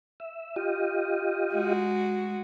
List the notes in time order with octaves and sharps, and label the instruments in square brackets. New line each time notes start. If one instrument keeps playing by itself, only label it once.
[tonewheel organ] E5
F4 G4 D#5
[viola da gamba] G#3 F#4